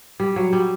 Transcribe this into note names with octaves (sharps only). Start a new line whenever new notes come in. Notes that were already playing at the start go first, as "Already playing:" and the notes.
G3
F#3
G3